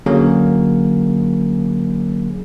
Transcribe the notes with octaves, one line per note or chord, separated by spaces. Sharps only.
D3 F#3 A#3 C#4 G#4 A#4